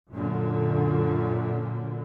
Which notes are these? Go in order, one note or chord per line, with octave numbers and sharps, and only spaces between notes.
F#2 A#2 D3